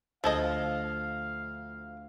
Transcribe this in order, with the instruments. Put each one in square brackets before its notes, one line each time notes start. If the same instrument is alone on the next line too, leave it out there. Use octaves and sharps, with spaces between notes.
[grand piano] D2 G#6 [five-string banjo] F3 A4 D#5 [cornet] F5